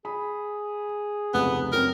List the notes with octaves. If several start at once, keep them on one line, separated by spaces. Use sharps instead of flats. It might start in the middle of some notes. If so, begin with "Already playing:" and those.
G#4 B5
F1 C#2 B3
F#2 C4 A#4